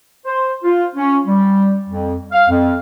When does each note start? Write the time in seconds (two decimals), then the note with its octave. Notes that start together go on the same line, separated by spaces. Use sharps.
0.25 C5
0.64 F4
0.96 C#4
1.27 G3
1.88 F2
2.32 F5
2.49 F2